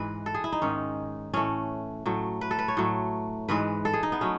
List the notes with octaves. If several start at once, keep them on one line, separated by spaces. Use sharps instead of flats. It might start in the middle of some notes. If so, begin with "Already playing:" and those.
Already playing: G#2 E3 G#3 B4
A4
G#4
E4
D#4
G#2 D#3 G#3 C#4
A2 E3 A3 C#4
A2 F#3 A3
B4
A4
B4
C#5
A2 F#3 A3
G#2 E3 G#3 B4
A4
G#4
D#4
B3
F#3 A3 C#4